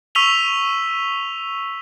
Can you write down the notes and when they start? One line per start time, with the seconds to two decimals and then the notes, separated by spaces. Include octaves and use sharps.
0.15 C#6 E6 B6 D#7 F7 G7